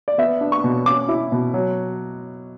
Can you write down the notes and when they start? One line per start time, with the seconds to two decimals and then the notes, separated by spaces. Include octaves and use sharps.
0.08 D5
0.18 B3 E5
0.41 D4
0.52 C#6
0.64 B2
0.86 C#4 D6
1.09 E4
1.32 B2
1.54 F#3